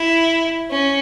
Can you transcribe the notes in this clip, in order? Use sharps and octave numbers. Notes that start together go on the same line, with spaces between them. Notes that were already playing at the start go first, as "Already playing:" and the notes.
Already playing: E4
C#4